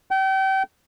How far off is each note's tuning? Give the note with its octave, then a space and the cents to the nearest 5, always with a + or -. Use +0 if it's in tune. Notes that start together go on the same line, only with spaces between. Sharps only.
G5 -35